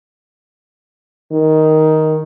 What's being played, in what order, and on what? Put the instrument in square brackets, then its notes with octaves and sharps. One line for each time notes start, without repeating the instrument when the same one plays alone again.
[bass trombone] D#3